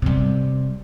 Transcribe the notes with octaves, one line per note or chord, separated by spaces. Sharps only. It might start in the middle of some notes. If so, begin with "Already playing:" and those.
C3 G3